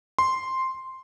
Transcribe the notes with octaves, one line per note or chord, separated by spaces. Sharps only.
C6